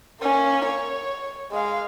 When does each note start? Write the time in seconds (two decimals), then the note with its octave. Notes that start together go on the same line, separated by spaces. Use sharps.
0.21 A#3 C#4
0.66 C#5
1.51 G#3 F5